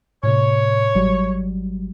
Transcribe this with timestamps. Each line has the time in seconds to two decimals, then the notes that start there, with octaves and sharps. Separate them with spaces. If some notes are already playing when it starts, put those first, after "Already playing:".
0.23 A2 C3 C#5
0.95 G#1 F#3 G3